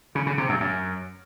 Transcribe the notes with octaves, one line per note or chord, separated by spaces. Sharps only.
C#3
C#3
C3
F#2
F#2